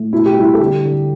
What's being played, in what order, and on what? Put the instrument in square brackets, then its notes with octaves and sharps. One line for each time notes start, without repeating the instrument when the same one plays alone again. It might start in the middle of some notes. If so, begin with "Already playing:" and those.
Already playing: [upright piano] A2
B2 E4
G4
G3 E4
A4
D3 G4
D3